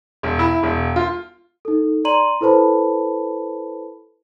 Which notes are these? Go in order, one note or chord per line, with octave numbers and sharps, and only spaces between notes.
E1
E4
E1
F4
D#4 A4
D5 A#5 C6 D#7 F#7
E4 A4 B4 C5 A5 B5